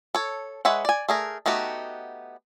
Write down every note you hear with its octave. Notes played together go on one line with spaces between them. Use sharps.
A4 C#5
G#3 B4 C#5 E5 F#5
D5 G#5
A3 G#4 A#4
A3 B3 D#4 F#4 G4